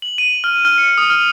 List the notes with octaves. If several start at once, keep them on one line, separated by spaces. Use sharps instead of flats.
F#7
D#7
F6
F6
C#7
D#6
F6